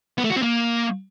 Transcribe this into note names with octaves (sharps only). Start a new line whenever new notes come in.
B3
A3
F#4
C4
A#3